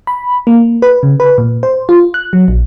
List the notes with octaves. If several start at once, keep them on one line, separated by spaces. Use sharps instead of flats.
B5
A#3
B4
C#3
B4
A#2
C5
F4
F#6
F#3
A#1